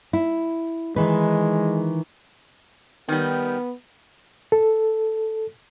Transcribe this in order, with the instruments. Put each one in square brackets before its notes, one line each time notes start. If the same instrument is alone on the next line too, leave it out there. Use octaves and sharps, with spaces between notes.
[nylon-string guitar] E4
[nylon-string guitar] D#3 E3 B4 [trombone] G#3
[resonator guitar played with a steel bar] D#3 G3 [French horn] B3
[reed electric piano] A4